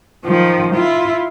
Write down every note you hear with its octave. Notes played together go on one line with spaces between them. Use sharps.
D#3 F3
E4 F4